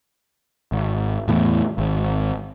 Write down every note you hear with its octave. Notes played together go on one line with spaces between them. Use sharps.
G#1
E2 A2 E3
G#1